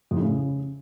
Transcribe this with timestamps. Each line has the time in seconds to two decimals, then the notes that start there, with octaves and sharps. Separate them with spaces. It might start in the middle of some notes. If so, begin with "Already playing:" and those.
0.11 F2
0.16 A2
0.22 C#3